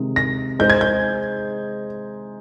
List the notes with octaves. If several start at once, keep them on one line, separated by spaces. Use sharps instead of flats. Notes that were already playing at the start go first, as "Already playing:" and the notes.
Already playing: C3 D#3 G#3
A#6
G#3 D#4 G#4 C5 G6
G#6
G6